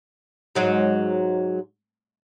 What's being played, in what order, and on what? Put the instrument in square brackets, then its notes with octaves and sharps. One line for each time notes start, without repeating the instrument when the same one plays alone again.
[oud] G#2 F#3 G#3